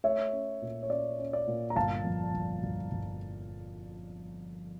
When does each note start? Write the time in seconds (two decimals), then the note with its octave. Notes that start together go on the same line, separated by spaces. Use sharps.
0.04 A3 C#5 E5
0.33 C#4
0.62 A#2
0.83 C#5
0.90 C#4 D5
1.19 C#4
1.33 D5
1.47 A#2
1.70 A#5
1.76 G1 F5 A5
2.04 F2
2.33 G1
2.63 G1
2.91 G1